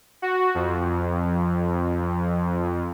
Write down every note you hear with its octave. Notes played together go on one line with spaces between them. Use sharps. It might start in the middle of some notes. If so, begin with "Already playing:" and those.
F#4
F2